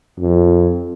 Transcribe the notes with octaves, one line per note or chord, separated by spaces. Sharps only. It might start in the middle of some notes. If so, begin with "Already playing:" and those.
F2